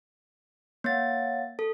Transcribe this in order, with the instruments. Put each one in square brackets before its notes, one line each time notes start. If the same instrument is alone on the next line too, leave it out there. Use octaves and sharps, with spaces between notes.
[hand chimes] A#3 A6 [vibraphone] C#5 F5 F#5
[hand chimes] A4